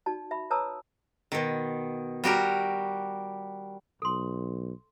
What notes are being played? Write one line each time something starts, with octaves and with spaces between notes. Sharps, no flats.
D#4 F#4 D5 A5
E5 B5
B4 C#5 A5 A#5 D#6 E6
B2 D#3
G3 F#4 G4 A#4
B1 A4 C6